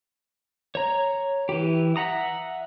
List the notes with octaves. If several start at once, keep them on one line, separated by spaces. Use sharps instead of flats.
C#5 A#5
E3 G4
E5 F#5 A#5 D#6